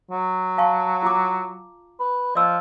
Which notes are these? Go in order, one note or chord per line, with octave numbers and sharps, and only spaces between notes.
F#3
F5 A5 C#6
F4 A#5 D6
B4
F3 D5 D#5 E6